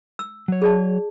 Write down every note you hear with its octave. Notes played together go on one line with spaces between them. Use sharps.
E6
F#3 C#5
G#4 D5 A5